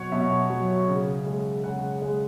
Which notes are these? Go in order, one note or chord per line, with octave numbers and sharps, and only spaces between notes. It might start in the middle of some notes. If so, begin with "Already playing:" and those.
Already playing: B2 F#3 C#5 F#5
B2 E5
F#3
C#3
G#3
C#3 F#5
G#3